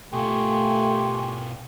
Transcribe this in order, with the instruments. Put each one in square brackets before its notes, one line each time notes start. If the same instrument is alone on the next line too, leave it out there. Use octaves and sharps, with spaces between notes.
[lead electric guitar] B2 F4 [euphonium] A3 [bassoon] G4 [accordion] G#5 C6 C#6